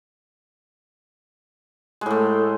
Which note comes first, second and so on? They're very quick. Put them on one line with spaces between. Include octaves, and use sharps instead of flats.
G#3 A2 A3